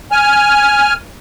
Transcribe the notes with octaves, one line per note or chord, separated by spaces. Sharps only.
G#5 F6